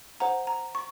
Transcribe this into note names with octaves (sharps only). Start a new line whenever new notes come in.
C5 F#5 A#5
A#5
C#6